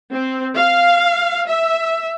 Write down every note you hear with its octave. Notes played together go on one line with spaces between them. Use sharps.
C4
F5
E5